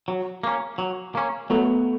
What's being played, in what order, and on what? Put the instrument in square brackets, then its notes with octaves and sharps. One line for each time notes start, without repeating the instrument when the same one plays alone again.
[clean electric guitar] F#3
A#3 C#4
F#3
A#3 C#4
[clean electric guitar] F#3 [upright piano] A3 B3